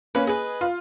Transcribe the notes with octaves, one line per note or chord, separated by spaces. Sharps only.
A#3 C#4 B4
G#4 B4 D#5
F4